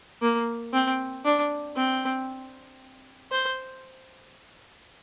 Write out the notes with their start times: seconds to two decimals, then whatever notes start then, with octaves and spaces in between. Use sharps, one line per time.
0.22 A#3
0.73 C4
1.25 D4
1.76 C4
3.32 C5